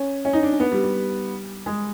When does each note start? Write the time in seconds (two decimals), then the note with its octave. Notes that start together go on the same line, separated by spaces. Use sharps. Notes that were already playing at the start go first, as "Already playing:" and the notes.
Already playing: C#4
0.25 C#4
0.33 D#4
0.43 D4
0.52 C#4
0.60 B3
0.72 G3
0.83 G3
1.66 G#3